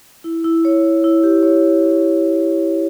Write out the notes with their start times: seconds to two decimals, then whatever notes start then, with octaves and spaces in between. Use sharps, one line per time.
0.24 E4
0.44 E4
0.65 C#5
0.83 C#5
1.04 E4
1.23 G4
1.43 C#5